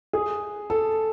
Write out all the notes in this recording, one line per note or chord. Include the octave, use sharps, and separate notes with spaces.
G#4
A4